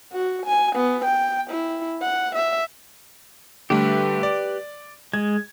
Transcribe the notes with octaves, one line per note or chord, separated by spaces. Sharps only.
F#4
G#5
B3
G5
E4
F#5
E5
D3 G3 A3 G4 B4
D5
G#3 G#6